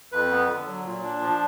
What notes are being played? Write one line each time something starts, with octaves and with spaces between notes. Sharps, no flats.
F2 B4
B3
D3
F#3
A#2
D4
F3